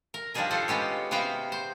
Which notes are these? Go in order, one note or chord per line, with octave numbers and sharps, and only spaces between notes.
A#4
F3 G3 D4 D#4 G#4 A#4
F4 A4 C5 F#5
G#3 B3 C#4 G4
C3 B3 F#4 G#4 F5 G5
C5